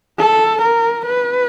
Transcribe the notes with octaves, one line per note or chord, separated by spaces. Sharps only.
A4
A#4
B4